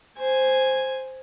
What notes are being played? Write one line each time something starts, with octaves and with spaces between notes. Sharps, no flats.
C5 G#5